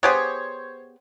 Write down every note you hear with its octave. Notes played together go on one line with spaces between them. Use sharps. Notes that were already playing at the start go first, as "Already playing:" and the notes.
B3 G4 G#4 C5 C#5